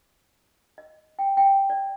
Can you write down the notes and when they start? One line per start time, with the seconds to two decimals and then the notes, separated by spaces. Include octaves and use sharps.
0.78 D#5
1.19 G5
1.37 G5
1.70 D5